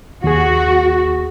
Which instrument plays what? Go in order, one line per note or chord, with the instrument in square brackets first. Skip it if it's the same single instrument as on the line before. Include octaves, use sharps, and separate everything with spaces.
[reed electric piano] D#2 G#4 [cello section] F#4